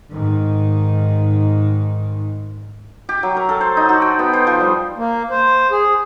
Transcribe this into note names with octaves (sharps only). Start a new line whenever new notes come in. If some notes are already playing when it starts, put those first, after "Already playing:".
G#2 D#3
G4
F#3
A#4
A4
C5
D#4
F#4
G5
B3
C5
F3
G3
A#3
C5
G#4